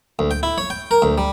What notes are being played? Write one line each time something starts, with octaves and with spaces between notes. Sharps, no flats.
D2
G5
E4
C#5
G5
A#4
D2
G3